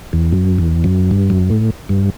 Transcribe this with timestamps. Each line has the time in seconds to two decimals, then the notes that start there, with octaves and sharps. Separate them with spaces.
0.13 E2
0.32 F#2
0.58 E2
0.84 F#2
1.11 G2
1.30 F#2
1.50 A2
1.89 G2